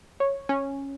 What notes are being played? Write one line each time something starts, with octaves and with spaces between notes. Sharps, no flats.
C#5
C#4